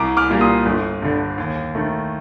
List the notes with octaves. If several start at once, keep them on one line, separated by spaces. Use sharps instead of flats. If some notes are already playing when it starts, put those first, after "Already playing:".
Already playing: C2 A#5 D6
D6 F6
A#2 G3 A#3
C6 D#6
G1
G2 D3
D#2
D#3 A3